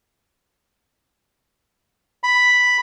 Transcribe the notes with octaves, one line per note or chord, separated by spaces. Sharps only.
B5